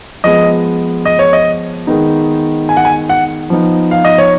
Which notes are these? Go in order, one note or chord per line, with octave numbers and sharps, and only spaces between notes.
F3 G#3 B3 D#5
D#5
C#5
D#5
D#3 G#3 B3 D#4
G#5
F#5
G#5
F#5
F3 B3 D#4
F5
D#5
C#5